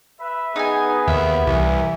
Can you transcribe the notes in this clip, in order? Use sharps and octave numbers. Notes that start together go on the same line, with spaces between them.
B4 E5
B3 D#4 G#4 G#5
D#2 E5
C2 E3